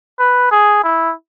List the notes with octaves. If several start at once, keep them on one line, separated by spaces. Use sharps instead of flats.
B4
G#4
E4